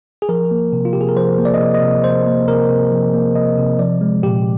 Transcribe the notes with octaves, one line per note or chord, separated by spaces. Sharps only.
G#4
F3 A#4
A#3
C3
F4
C3 G4
G#4
A#4
F3 C5
A#3
D5
D#5
C3 D5
D#5
C3
F3 C5
A#3
C3 A#4
C3
F3
A#3
C3 D#5
C3
F3 D5
G#3
A#2 G4